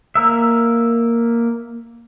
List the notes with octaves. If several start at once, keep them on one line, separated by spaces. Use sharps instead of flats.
A#3 A#4 E5